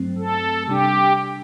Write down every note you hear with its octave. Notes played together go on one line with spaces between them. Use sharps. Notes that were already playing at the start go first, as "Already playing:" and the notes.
Already playing: G2 F#3 A3 C4
A4
C3 G3 D4 G4